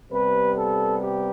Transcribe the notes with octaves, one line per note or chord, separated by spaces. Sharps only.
C3 G3 B3 B4
A4
G4